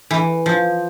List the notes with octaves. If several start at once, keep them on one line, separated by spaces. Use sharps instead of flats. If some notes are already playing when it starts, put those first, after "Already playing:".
E3
F3